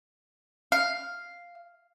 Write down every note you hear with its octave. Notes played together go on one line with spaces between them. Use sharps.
F5